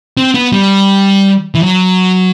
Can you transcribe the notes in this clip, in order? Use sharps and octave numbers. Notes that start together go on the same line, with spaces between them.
C4
B3
G3
E3
F#3